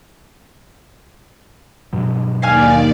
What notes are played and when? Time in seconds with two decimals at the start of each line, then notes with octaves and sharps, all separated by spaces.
1.93 G2 B2 F#3
2.42 D#2 D#3 D5 F5 G#5 F6